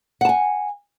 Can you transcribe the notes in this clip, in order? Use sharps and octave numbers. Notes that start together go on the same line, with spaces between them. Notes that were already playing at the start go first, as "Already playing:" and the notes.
F#5 G#5 A5